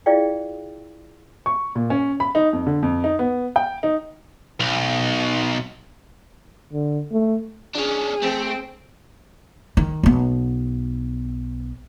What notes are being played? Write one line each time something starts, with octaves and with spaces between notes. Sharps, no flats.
E4 F4 G#4 D5 F5 G5
C#6
A#2
C#4
B5
D#4
F2
D3
F2
D#4
B3
G5
D#4
B1
D3
A3
C#4 D4 G#4
A3 C4
D#3
B1 B3